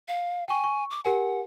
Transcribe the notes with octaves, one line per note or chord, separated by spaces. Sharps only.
F5
G5 G#5 C#6
C#6
D6
G4 A#4 F#5 G#5